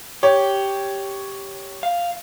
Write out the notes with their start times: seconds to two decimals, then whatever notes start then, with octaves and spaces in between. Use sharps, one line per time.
0.23 G4 C#5
1.83 F5